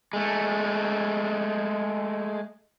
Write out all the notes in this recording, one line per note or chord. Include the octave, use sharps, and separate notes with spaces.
G#3 A3